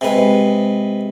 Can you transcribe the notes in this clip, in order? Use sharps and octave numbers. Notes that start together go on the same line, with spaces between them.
C3 G#3 B4